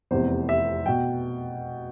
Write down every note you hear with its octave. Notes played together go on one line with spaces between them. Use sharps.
F1 E2 C3 C5
E5
B2 G5